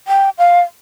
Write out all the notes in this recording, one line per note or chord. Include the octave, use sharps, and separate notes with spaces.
G5
F5